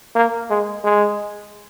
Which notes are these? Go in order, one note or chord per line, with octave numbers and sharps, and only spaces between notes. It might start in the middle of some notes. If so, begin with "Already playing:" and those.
A#3
G#3
G#3